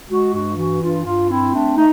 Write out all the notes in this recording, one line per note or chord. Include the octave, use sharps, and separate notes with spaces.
G#3 F#4
G2 F#4
E3 F#4
G2 F4
G2 F4
C4 E4
A3 D4
A3 D#4